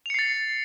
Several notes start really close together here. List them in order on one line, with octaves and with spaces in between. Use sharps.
F7 C#7 C7 A6